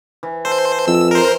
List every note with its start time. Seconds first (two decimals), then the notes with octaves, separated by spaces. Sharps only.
0.23 E3
0.45 A4 C5
0.88 F2 E6
1.11 A#4 C5